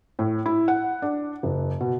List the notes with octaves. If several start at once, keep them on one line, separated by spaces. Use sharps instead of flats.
A2
E4
F#5
D4
F#1
B2